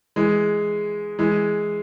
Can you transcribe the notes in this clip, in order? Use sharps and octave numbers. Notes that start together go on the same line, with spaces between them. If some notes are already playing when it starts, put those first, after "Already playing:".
E3 G#3
E3 G#3